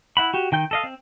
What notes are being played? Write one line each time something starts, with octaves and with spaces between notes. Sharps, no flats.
E4 F#5 B5
F#4 G4
D#3 G5 G6
A4 D#5 F5
C4